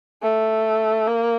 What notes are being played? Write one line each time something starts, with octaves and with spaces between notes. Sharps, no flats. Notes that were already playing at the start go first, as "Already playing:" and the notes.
A3
A#3